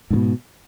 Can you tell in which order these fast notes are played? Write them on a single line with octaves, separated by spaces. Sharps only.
G#2 D3 B2